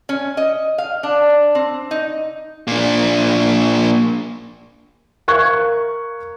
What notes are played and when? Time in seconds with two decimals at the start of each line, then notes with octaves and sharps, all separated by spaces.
0.09 C#4
0.37 D#5
0.78 F5
1.03 D4
1.55 C4
1.91 D#4
2.67 A#2 D4
5.28 A#4 F5 C#6 F#6 G#6